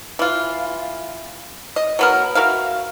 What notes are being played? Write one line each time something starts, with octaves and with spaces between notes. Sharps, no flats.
E3 F4
D#5
F#3 B3 A#4
F#4 A#4 E5 F5